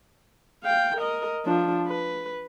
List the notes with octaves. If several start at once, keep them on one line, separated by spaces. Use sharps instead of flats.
F5 G5
A#4 D#5
F3 D4
B4